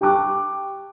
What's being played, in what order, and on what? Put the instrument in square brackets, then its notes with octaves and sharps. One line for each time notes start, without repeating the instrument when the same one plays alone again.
[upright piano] G4 G5 A5 C#6 D6 F#6